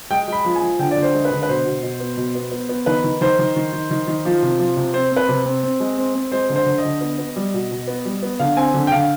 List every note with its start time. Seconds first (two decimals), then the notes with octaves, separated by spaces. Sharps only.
0.11 G#3 G5
0.28 G#3 B5
0.45 F3
0.56 G#5
0.62 F3
0.79 D3 G5
0.91 D5
0.96 D3
1.02 C5
1.14 G#3
1.25 B4
1.31 D3
1.43 B4
1.49 B2 C5
1.65 B2
1.83 B2
2.00 B3
2.17 B2
2.35 B3
2.51 B3
2.69 B3
2.86 D#3 B4
3.04 D#3
3.21 D#3 C5
3.39 D#3
3.56 D#3
3.73 D#3
3.91 D#3
4.07 D#3
4.25 F3
4.42 C3
4.59 F3
4.77 C3
4.94 C4 C5
5.11 C4 B4
5.29 C3
5.46 C4
5.63 C4
5.80 G#3
5.98 C4
6.15 C4
6.32 G#3 C5
6.49 D3
6.56 C5
6.66 D3
6.78 D#5
6.85 D3
7.01 B3
7.18 B3
7.36 G3
7.54 B2
7.71 B2
7.88 B3
8.05 G3
8.23 B3
8.40 D3 F5
8.56 C4 G#5
8.74 D3
8.87 G5
8.92 D3 F5